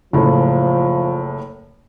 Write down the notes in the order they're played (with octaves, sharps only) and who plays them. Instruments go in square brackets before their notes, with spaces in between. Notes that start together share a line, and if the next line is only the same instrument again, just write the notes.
[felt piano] F#1 A2 [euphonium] F3